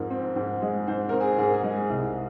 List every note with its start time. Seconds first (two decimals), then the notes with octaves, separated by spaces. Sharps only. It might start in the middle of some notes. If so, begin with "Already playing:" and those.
Already playing: F2 G#2 A#4
0.10 C4
0.36 G#2
0.62 G#3
0.87 G#2 C5
1.09 C4 A#4
1.21 G#4
1.38 G#2 G#4
1.46 A#4
1.54 G#4
1.63 G#3
1.90 C2